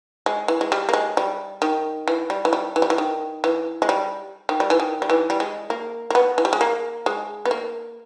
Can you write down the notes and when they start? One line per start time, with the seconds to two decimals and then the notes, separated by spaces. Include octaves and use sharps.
0.26 G#3
0.48 E3
0.61 G#3
0.72 G3
0.89 A#3
0.94 G#3
1.17 G3
1.62 D#3
2.08 E3
2.30 G3
2.45 E3
2.53 G3
2.76 E3
2.82 G3
2.90 E3
2.98 D#3
3.44 E3
3.82 G#3
3.89 G3
4.49 D#3
4.60 G3
4.70 E3
4.80 D#3
5.02 G3
5.10 E3
5.30 G3
5.40 G#3
5.70 A#3
6.10 A#3
6.15 B3
6.38 E3
6.45 G3
6.53 G#3
6.61 A#3
7.06 G#3
7.45 B3
7.51 A#3